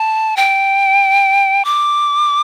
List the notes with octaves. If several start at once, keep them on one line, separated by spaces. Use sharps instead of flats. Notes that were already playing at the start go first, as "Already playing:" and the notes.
Already playing: A5
G5
D6